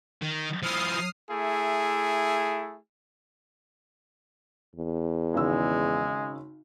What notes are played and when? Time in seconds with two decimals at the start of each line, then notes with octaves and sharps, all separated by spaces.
0.22 D#3
0.62 F3 E4 D#6 F6 C7
1.31 A3 E4 G#4
4.76 E2
5.34 G#1 C#3 G#3 E6